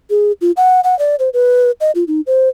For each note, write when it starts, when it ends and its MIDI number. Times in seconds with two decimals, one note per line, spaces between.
0.10 0.32 68
0.41 0.52 65
0.57 0.81 78
0.84 0.97 78
0.99 1.16 74
1.19 1.29 72
1.34 1.71 71
1.81 1.91 75
1.95 2.04 65
2.08 2.21 63
2.27 2.49 72